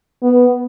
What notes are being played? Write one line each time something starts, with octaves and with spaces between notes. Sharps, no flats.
B3